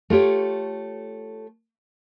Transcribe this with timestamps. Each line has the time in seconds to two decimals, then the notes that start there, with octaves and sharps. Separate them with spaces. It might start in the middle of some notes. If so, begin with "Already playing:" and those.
0.10 A3 F4 G4 C#5